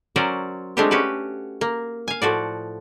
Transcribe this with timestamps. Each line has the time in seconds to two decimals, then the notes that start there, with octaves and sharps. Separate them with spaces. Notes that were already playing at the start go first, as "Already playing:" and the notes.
0.16 F#3 C#4 A#4 C5 D5
0.77 G#3 A3 C4 D4 F4 G4
0.91 C#4 F#4 G4 B4
1.61 A#3
2.08 F5 G#5
2.22 A2 F3 F#4 D5